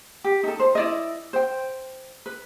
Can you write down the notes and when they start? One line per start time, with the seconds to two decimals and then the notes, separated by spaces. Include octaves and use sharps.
0.24 G4
0.43 D#4 A4
0.60 C5
0.75 E4 D5 D#5
1.33 C5 G5
2.26 B4